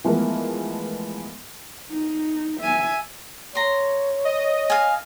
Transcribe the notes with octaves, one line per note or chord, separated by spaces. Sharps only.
E3 F3 G#3 A3 B3 A#4
D#4
E5 G#5
C#5 A#5 C6
D#5
F5 G#5